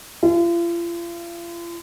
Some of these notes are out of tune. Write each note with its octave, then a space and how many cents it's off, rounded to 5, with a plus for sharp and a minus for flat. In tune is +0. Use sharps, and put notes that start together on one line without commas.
F4 -40